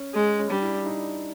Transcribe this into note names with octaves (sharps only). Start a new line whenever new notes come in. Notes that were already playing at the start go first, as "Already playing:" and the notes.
Already playing: C#4
G#3
C#4
G3 D4
E4
E4
D#4